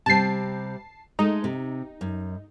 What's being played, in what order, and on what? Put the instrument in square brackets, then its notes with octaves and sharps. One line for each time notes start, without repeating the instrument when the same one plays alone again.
[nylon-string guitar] C3 G3 C4 [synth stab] A5 C7
[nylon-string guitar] G#3 A3 [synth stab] D#4
[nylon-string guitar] C3
F#2